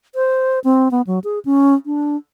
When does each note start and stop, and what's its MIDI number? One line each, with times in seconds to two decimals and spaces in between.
0.15 0.59 72
0.64 0.91 60
0.91 1.02 59
1.07 1.19 54
1.24 1.39 68
1.45 1.75 61
1.86 2.16 62